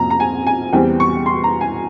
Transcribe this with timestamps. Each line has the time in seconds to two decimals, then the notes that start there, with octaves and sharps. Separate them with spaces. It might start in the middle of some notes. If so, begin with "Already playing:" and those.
Already playing: F2 C3 F3 A#3 A#5
0.10 A#5
0.20 G#5
0.47 G#5
0.73 E2 E3 G3 C4 G5
1.00 C#6
1.26 C6
1.44 A#5
1.61 G#5